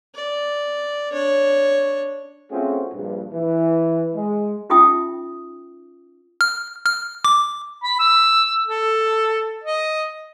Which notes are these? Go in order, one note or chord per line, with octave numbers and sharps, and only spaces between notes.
D5
D4 C#5
A3 C4 C#4 F4 F#4 G#4
A#1 G2
E3
G#3
C#4 D#4 F4 E5 G5 D#6
F6
F6
D6
B5
E6
A4
D#5